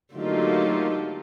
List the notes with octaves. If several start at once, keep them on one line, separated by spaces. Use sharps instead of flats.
G#1 D3 F#3 A3 A#3 D#4 F4 G4